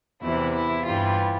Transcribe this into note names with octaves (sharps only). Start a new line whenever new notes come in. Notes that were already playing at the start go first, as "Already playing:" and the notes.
E2 C3 E3 E4
E4
G2 E3 G3 F4